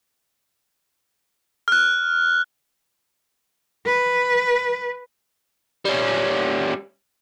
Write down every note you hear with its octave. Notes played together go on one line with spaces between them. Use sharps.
F6 F#6
B4
G3 C#4